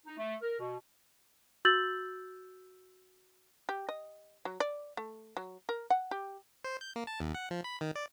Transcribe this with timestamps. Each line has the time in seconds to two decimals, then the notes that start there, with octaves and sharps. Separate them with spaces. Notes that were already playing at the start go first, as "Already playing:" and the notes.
0.06 D#4
0.18 A3
0.42 A#4
0.59 B2
1.65 F#4 E6 G6 A6 F#7
3.69 G4
3.89 D#5
4.45 F#3
4.60 D5
4.97 A3
5.37 F#3
5.69 A#4
5.90 F#5
6.11 G4
6.65 C5
6.81 G6
6.96 A#3
7.07 A5
7.20 D#2
7.35 F#5
7.51 F3
7.64 B5
7.81 D#3
7.95 D5